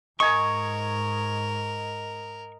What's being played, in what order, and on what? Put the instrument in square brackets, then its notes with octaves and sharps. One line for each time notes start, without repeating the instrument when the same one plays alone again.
[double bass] G#2 [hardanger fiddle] A#4 [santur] D#5 G#5 [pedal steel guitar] C#6